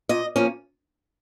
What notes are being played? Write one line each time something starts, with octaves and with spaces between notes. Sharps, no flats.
A#2 D#5
F3 A#3 C#4